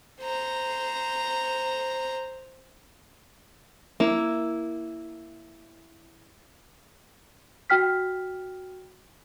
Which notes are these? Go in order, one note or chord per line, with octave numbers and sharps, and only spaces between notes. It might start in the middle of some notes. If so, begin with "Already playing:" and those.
C5 A#5
A#3 E4
F#4 G5 F6 B6